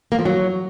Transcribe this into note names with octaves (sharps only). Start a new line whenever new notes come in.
A#3
F3
F#3